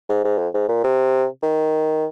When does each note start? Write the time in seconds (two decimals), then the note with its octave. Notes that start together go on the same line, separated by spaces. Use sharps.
0.09 G#2
0.24 G#2
0.38 F2
0.54 G#2
0.69 A#2
0.84 C3
1.43 D#3